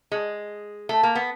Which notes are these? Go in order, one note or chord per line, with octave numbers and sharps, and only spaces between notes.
G#3
A3
A#3
B3